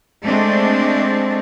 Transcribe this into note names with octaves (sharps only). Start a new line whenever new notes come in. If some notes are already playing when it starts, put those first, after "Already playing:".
G#3 A3 C4 D4